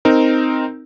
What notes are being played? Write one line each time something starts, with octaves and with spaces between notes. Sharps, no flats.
C4 D#4 A#4